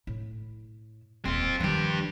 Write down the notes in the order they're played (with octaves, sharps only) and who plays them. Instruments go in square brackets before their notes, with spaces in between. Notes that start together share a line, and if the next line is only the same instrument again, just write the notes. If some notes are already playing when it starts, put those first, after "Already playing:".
[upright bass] A2 E4
[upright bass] D#1 A1 [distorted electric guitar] C4 F4
[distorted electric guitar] G2 G4 [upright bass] D#3 F3